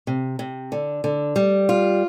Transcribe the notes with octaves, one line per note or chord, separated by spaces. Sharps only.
C3
C3
D3
D3
G3
F4